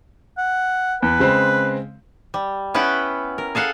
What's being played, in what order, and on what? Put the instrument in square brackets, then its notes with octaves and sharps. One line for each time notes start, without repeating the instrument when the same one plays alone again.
[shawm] F#5
[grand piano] E2 [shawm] B4
[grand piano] C#3 G#3 C4
[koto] G3
B3 C#4 E4 B4 F#5 G5
A#4
G#4 A4 F5 F#5